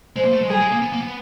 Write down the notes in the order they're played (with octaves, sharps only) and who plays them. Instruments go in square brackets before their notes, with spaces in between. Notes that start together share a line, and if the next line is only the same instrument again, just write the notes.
[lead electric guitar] G#3 [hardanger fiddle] C5
[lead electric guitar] A#3
A3
G#3
[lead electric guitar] G3 [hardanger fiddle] G#4
[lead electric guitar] G#3
A#3
B3
A#3
B3